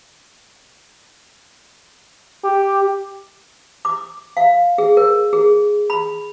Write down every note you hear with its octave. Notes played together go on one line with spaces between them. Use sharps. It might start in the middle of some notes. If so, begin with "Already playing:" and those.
G4
D6
F5
G#4
A#4
G#4
B5